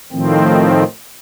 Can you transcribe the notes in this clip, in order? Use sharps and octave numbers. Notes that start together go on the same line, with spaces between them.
A2 D#3 F3 C4